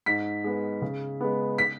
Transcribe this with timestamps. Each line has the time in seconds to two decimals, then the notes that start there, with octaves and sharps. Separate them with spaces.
0.06 G#2 B6
0.44 G#3 B3
0.82 C#3
1.21 G#3 B3
1.58 B6